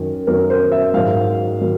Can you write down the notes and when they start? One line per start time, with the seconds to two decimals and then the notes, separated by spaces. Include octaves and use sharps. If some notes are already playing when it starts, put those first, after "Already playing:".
Already playing: F#2 D#3 F#3
0.27 F#2 D#3 F#3 A#4
0.50 C5
0.72 E5
0.94 G#2 D#3 F#3 F5
1.61 D#3 F#3